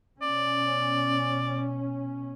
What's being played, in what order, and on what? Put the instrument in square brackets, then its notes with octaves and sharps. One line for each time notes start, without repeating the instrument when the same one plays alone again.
[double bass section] B2 C#4 [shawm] D5